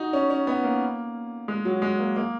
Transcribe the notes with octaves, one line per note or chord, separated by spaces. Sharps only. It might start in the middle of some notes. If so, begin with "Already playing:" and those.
Already playing: D#4 F#4
C#4
C#4
B3
A#3
G#3
F#3
G#3
A#3
A#3